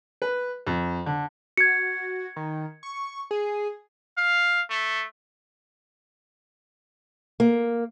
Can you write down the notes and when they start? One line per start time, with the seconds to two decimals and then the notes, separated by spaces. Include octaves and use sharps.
0.22 B4
0.67 F2
1.06 D3
1.57 F#4 G#6 C#7
2.36 D#3
2.83 C#6
3.31 G#4
4.17 F5
4.70 A3
7.40 A#3